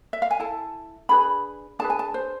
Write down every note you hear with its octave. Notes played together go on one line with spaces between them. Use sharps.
E5
F5
G#5
E4 A4 A5
D4 G#4 B4 B5
D4 G#4 B4 A5
G#5
A5
C5